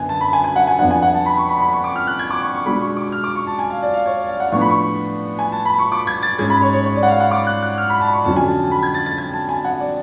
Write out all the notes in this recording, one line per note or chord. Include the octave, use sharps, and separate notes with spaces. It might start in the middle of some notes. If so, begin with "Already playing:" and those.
Already playing: F#2 D3 B3 G#5
A5
B5
G#5
G#5
F#5
G#5
F2 F3 B3 D4 F#5
G#5
F#5
A5
B5
C#6
B5
B5
C#6
D6
F6
F#6
G#6
D6
C#6
C#6
B2 G#3 D4 B5
C#6
D6
F6
D6
C#6
A5
G#5
F5
D5
F5
C#5
F5
F#5
A2 F3 B3 D4 C#6
B5
C#6
G#5
A5
B5
C#6
D6
G#6
A6
G#2 G#3 C#4 G#6
B5
C#5
C#5
C#5
D5
F#5
F5
F#5
D6
F#6
F#6
F6
B5
A5
B5
C#6
F2 D3 F#3 C#4 A5
G#5
A5
A5
B5
G#6
A6
A6
G#6
A5
G#5
F#5
D5